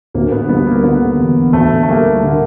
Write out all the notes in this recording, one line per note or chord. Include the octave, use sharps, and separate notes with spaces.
D2 A#3
B3
G3 B3
A#3
D3 B3
E1
D2 A3
A3
G3 A#3
D3 A#3